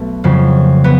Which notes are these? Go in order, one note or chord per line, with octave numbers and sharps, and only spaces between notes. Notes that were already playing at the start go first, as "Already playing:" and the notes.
Already playing: B1 B2 A3 B3
F2 C#3 F#3
B3